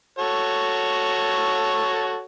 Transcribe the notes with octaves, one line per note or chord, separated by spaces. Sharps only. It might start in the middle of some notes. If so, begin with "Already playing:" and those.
F#4 A4 C#5